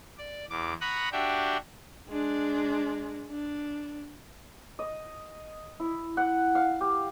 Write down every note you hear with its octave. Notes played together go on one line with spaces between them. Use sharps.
D5
E2 D6
F#5 A#5 B5 C#6 D#6 F#6
D4 F#4 G4 E5 G5
G#3 D4
D4
D#5
E4
F#5
F5
G4